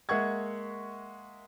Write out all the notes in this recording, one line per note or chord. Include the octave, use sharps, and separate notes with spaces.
G#3 A#3 E5 F#5 C#6 G#6